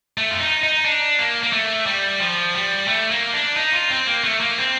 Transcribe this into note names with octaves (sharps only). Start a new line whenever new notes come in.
A3
F4
D#4
D#4
D4
A#3
A#3
A3
G3
F3
G3
A3
A#3
D4
D#4
F4
C4
A#3
A3
A#3
C4